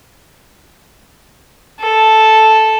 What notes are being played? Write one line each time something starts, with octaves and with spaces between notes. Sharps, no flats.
A4